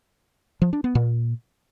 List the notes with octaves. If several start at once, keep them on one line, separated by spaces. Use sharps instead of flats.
F3
D4
B3
A#2